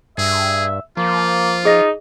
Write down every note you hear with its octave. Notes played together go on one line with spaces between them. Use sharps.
G2 G#4 E5
F3 A#3 F4
D#4 G#4 D#5 A#6